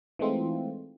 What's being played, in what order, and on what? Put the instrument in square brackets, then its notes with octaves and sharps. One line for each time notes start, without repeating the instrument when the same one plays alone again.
[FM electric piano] E3 G#3 A3 C4 D#4 F4